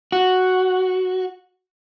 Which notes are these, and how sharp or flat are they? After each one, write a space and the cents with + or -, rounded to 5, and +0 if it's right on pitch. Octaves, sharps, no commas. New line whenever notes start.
F#4 +0